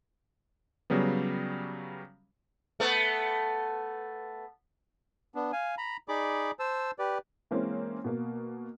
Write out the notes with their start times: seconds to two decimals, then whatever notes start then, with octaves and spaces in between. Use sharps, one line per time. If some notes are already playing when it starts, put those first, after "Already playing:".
0.90 C#3 F#3 G3 B3
2.80 A3 B3
5.35 B3 D4
5.52 F5 G#5
5.78 A#5 B5
6.08 D#4 G#4 D5 B5 D6
6.59 C5 A5 E6
6.99 G4 B4 D5
7.51 E3 G#3 A#3 C4 C#4
8.04 B2 A#3